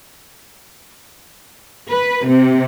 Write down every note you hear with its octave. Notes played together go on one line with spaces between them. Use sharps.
B4
C3